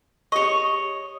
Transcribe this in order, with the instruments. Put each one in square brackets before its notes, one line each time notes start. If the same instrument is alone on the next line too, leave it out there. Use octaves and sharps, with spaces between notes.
[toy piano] G4 C#6 [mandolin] C#5 D#5